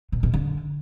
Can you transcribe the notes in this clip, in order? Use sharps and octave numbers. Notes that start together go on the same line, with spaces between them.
B2
B2
D3